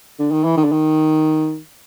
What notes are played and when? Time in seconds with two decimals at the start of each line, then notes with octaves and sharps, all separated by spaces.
0.19 D3
0.31 D#3
0.44 E3
0.57 D#3
0.64 D3
0.71 D#3